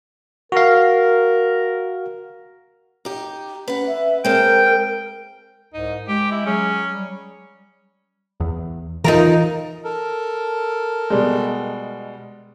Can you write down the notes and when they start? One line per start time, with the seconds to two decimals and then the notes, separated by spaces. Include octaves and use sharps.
0.52 F#4 A#4 F5
3.05 D#4 G4
3.68 C#4 B4 F#5
3.86 E5
4.25 G#3 C4 A#4 G5
5.74 C2 G#2 D#4
6.08 G#3 G4
6.31 E4
6.46 F#3 C#4 G#4
6.92 G3
8.40 E2
9.05 E3 D#4 F4 A#4
9.84 A4 A#4
11.10 B2 G3 G#3